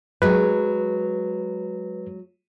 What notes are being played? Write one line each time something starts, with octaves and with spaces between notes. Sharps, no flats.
F#3 G#3 B4